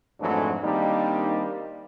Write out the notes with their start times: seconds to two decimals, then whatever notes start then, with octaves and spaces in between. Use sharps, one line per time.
0.20 F2 G#2 E3 F#3 A3 D4
0.63 D#3 G3 A#3 C4 D4 D#4